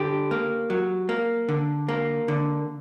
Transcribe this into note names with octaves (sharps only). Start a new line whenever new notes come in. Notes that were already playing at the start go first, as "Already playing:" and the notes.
Already playing: D3 G4
A#3
F#3
A#3
D3
A#3
D3